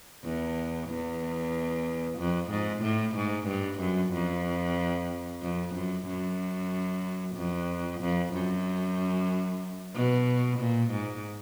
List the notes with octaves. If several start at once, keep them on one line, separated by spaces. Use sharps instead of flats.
E2
E2
F2
G#2
A2
G#2
G2
F#2
F2
F2
F#2
F#2
F2
F2
F#2
B2
A#2
G#2